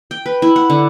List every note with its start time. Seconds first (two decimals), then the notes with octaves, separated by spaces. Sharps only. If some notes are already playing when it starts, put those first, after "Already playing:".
0.11 G5
0.26 B4
0.42 E4
0.56 F#5
0.70 D3